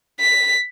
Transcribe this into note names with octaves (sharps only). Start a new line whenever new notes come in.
B6